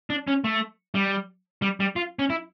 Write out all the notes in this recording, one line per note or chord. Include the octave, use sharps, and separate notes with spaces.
D4
C#4
A3
G3
G3
G3
F4
C#4
E4